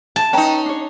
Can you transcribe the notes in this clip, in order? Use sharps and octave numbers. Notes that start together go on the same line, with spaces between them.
A5
C#4 D#4 B4 G5 A#5
D4 C#5